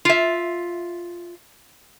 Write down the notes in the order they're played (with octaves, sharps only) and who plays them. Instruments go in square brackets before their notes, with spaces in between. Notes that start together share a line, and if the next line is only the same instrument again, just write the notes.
[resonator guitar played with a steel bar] F4 E5